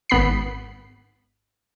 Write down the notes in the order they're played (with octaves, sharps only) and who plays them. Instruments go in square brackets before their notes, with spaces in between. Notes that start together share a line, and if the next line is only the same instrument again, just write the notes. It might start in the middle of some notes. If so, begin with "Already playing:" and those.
[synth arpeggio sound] G#1 B3 B5 B6 C7